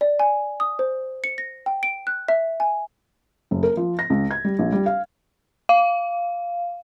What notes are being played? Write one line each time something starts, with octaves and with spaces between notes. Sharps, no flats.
D5
G#5
D#6
C5
C#7
A#6
G5
D7
F#6
E5
G#5
F#1
A#4
F3
A#6
C#2
G#6
G3
A#1
G3
F5
F5